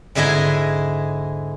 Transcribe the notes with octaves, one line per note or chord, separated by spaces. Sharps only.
G#2 D3 E4 G#4 D#5